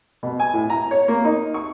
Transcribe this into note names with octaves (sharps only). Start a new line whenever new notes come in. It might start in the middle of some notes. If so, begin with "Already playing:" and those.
B2
G#5
A2
A#5
C#5
A#3
D#4
C#6